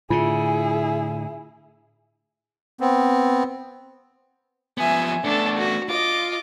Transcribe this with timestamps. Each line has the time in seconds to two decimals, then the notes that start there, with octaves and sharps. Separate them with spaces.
0.10 A2 D3 E4 F4 G#4
2.80 B3 C4
4.78 F3 B3 E5 G#5
5.24 A3 B3 D4 A4
5.57 F#4
5.89 F4 D#5 D6